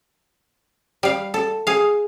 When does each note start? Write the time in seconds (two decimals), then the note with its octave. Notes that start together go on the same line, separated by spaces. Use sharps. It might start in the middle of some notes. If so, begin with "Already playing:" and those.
1.03 G3 F5
1.34 A4
1.67 G#4 F5